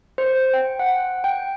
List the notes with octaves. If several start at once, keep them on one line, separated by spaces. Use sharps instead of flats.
C5
G5
F#5
G5